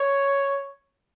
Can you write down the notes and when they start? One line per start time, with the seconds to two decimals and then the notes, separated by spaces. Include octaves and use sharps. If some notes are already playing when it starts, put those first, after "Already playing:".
Already playing: C#5